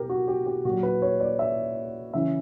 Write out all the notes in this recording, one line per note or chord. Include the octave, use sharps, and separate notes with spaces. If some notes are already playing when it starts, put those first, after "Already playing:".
Already playing: B2 G4 A#4
F#4
G4
G4
A#2 F#3 F#4
B4
C#5
D5
E5
C#3 E3 E5